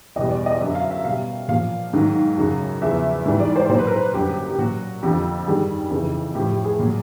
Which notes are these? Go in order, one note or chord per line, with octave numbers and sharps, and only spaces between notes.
E2 B2 G3 D#5
D5
D#5
D#5
F#2 D3 F#3 E5
F5
E5
B2 G3 F5
A#2 F3 F5
G#2 D#3 F#3
F#2 C#3 F#3
E2 C#3 F3 E5
G#2 E3 G3
D5
C5
A#2 F#3 C5
B4
A#4
B4
F#2 D3 G3 G4
G4
G4
A#2 F#3 F#4
F2 D3 F3 G4
G2 D#3 G3 G#4
F2 C#3 E3
A2 F3 G4
G4
G#4
A#2 F#3